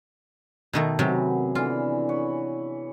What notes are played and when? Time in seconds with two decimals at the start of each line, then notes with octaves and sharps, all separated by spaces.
0.73 B2 D#3 A3
0.99 F#2 C3 F#3 B3 G#4
1.55 D3 E3 F4 G#4
2.09 B4 C#5